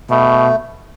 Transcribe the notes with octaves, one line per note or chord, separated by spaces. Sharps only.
B2 A3